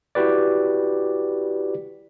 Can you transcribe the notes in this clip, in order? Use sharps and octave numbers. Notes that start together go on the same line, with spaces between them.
E4 F#4 G4 B4 D5